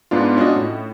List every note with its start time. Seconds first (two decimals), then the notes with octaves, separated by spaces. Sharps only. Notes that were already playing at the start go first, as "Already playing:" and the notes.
0.11 G#2 B3 D4 F4
0.37 C#4 D4 F4 F#4 D#5
0.56 A2